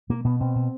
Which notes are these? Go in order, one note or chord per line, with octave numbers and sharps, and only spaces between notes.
B2 A#3
B2 B3
B2 C4
B2